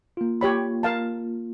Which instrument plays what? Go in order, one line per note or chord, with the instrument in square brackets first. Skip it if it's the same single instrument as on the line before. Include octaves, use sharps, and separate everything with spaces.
[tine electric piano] A#3 F4
[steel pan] G4 C#5 B5
A#4 F5 A5